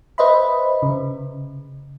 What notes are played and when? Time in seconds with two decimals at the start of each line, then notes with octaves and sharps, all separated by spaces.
0.18 B4 C5 D#5 E5 B5
0.82 C#3